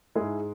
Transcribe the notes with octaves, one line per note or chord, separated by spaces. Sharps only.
G#2 G#3 E4 G#4